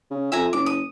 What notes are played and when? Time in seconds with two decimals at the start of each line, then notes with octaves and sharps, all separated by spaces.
0.10 C#3
0.32 F2 E5 G#5 A#5
0.53 F#1 D6
0.66 D#6